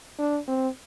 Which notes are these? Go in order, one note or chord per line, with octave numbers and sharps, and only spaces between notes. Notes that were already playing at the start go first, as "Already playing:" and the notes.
D4
C4